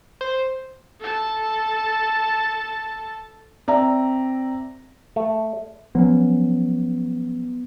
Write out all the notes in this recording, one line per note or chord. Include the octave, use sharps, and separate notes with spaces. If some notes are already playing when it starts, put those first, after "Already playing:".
C5
A4 A5
C4 D5 E5 A#5
A3
F3 F#3 B3 C#4